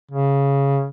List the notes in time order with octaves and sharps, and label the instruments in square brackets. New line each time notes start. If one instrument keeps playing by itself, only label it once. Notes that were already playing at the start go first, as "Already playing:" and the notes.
[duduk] C#3